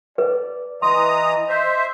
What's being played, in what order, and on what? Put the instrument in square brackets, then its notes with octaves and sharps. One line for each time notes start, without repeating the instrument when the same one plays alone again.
[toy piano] B4 [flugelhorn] D5
[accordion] E3 A#5 D#6 [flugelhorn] D#5 [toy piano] C6
[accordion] C5 E5